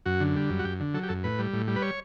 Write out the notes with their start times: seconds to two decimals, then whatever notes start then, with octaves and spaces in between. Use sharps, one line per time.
0.06 F#2 F#4
0.20 D3
0.36 G3
0.50 F#2
0.59 F#4
0.65 F#2 G4
0.80 D3
0.94 F#3 A4
1.03 G4
1.09 F#2 A4
1.24 A2 B4
1.39 G3
1.53 A2
1.68 G3
1.76 B4
1.82 C#5